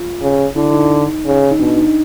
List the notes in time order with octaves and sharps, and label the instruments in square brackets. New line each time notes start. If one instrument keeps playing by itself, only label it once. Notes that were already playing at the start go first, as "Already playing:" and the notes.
Already playing: [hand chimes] F4
[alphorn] C#3
[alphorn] D3 [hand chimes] E4
[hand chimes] D#4
[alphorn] C#3
[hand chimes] D#4
[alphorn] B2 [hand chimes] D4
[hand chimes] D#4